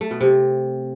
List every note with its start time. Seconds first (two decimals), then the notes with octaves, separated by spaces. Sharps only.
0.01 A3
0.11 B2
0.21 C3